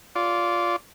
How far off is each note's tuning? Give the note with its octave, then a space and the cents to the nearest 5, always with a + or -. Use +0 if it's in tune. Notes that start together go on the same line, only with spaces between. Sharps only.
F4 +0 D5 -20